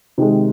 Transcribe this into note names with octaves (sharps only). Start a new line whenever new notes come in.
C3 D#3 G#3